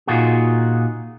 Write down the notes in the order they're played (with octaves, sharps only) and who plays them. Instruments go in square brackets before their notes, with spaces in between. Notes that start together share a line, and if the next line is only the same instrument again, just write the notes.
[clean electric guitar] A#2 D#4 F4 F#4 G#4